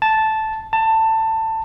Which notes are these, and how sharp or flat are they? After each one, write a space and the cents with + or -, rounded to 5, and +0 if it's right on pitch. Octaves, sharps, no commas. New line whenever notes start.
A5 -5
A5 +20